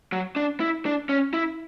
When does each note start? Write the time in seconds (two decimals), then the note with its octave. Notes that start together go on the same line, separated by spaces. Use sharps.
0.12 F#3
0.36 D4
0.60 E4
0.86 D4
1.09 C#4
1.34 E4